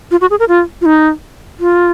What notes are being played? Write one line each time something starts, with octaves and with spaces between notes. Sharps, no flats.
F4
F#4
G#4
A#4
F4
F4
D#4
F4